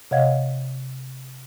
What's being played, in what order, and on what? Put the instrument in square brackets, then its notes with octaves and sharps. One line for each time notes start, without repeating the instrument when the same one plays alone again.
[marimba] C3 C#5 D#5 F5 F#5 G#6